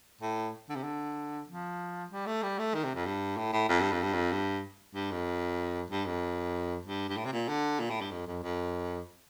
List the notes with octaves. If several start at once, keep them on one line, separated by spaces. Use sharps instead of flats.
A2
D3
C3
D3
F3
G3
A3
G3
A3
D#3
C3
F2
G2
A2
A2
F2
G2
F2
G2
F2
G2
G2
F2
G2
F2
G2
G2
A2
C3
A#2
D3
A#2
A2
G2
F2
F2
F2